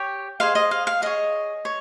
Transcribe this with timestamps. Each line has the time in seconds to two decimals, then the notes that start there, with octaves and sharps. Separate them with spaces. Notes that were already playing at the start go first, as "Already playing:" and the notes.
Already playing: G4 C#5 G5
0.40 G#4 C5 D#5 F5
0.55 D#5
0.71 F5
0.87 F5
1.02 G#4 C#5 D#5
1.65 C#5